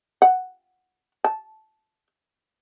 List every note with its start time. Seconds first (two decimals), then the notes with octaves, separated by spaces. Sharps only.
0.22 F#5
1.24 A5